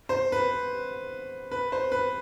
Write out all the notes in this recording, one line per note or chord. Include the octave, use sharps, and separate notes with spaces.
C5
B4
B4
C5
B4